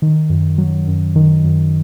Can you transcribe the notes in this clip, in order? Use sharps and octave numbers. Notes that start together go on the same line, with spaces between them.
D#3
F#2
F#3
F#2
D#3
F#2